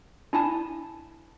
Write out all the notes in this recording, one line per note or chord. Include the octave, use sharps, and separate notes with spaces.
D4 E4 G#5 A5